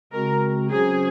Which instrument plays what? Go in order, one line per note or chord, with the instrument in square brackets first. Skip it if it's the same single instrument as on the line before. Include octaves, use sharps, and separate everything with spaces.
[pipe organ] C#3 G#3 C4 F#4 [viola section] A#4
[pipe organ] F#3 C#4 F#4 C5 [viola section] G#4